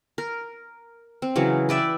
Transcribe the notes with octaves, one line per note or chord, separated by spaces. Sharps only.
A#4
C4
C#3 E3 F#3
B4 D5 E5 G5